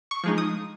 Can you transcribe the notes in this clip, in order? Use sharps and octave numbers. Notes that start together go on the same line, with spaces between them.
C#6
F3 G#3 D#4
D#6